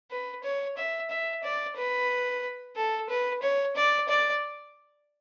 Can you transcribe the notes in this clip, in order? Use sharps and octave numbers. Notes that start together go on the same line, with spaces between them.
B4
C#5
E5
E5
D5
B4
A4
B4
C#5
D5
D5